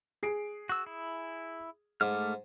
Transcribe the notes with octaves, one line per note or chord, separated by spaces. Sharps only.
G#4 C7 D7
F#4 E6
E4
G#2 A3 D6 F6